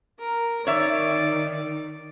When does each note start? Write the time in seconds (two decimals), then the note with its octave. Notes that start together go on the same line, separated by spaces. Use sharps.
0.19 A#4
0.67 D#3 C#5 D5 E5